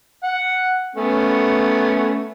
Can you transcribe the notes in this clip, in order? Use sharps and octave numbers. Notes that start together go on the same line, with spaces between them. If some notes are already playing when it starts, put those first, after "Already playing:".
F#5
A3 B3 C#4